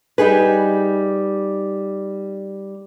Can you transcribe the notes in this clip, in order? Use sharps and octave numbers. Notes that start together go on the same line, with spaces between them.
G3 D#4 G#4 B4